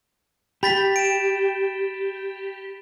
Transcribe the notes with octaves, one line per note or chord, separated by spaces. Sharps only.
G4 B5 A6 B6
D7 E7